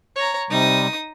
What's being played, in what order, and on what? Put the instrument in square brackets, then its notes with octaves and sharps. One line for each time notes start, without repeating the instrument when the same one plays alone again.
[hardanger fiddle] C#5 A#5
[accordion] C3 G3 [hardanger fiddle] D#4 D#6